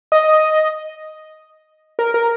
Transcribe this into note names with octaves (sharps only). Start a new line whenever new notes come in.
D#5
A#4
A#4